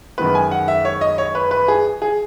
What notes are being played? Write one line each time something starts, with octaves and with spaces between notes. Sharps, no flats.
F#2 D#3 G#3 B3 B4
G#5
F#5
E5
C#5
D#5
C#5
B4
B4
G#4
G#4